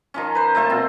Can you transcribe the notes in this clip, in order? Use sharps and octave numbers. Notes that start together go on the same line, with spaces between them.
D#3 F3 C#4
B4 C5
A#2 A3 C5 A5
B2 C4 F4